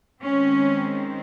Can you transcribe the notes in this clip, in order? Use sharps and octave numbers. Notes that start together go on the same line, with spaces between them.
D#3 G#3 C4 C#4